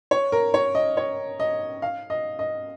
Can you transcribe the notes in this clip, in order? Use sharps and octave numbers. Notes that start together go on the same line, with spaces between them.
C#5
A#4
C#5
D#5
C#5
D#5
F5
D#5
D#5